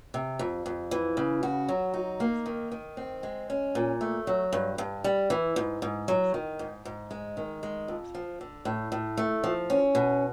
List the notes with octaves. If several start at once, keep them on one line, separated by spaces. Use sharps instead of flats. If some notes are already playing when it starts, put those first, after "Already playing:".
C3
F2
F2
E3
C#3
F#4
F#3
D#4
A#3
D#3
D#3
C4
G#3
C#4
A#2
A3
F#3
G2
G2
G3
E3
G#2
G#2
F#3
D#3
G#2
G#2
G#3
D#3
G#3
F2
F3
D3
A2
A2
A3
F3
C#4
B2